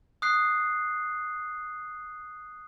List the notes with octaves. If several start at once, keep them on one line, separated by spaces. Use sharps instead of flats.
D#6 F#6 C7